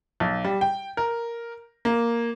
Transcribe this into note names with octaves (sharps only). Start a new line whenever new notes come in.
B1
G3
G5
A#4
A#3